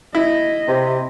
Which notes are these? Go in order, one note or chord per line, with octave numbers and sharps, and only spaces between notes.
E4 D#5
C3